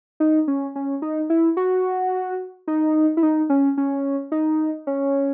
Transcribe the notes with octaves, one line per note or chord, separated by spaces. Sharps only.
D#4
C#4
C#4
D#4
E4
F#4
D#4
E4
D#4
C#4
C#4
D#4
C#4